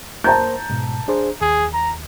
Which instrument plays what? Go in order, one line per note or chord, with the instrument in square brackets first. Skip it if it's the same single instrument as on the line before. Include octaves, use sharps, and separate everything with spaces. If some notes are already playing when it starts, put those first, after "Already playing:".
[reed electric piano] A#3 A#4 C5 [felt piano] A5 A#5 G6
[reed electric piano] G#2 B2
D4 G#4 C5
[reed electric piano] D#2 [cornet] G#4
[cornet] A#5